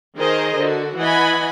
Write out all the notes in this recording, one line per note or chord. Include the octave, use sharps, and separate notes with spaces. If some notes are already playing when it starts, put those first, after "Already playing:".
D#3 G#4 A#4 C5 D#5
D3 F#4
E3 D#5 F#5 G#5 B5